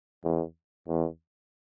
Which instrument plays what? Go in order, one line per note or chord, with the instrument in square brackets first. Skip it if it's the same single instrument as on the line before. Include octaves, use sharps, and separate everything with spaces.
[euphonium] E2
E2